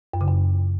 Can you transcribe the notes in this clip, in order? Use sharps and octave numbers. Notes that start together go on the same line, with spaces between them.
F#2
C#3
F#2